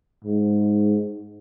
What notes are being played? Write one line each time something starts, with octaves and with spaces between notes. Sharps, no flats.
G#2